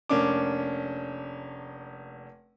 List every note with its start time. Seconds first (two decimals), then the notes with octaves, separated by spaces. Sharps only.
0.09 F1 A#3 C#4 D4 D6